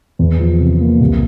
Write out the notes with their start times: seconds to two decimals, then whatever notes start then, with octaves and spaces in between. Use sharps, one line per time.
0.19 E2
0.39 F3
0.60 C3
0.80 A#3
1.01 C2